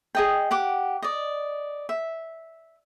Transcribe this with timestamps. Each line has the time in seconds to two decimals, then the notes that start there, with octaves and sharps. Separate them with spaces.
0.15 G#4 D#5 G5
0.51 G4 F#5 D6
1.02 D5 D#5
1.89 E5